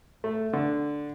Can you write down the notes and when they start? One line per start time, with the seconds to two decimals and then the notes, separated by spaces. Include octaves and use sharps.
0.24 A3
0.53 D3